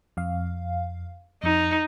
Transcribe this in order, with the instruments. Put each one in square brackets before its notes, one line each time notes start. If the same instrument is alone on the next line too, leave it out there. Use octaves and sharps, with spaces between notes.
[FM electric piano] F2 F5
[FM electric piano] F2 [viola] D#4